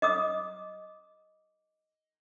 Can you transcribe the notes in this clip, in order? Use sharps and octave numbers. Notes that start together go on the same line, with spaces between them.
D#5 D6 D#6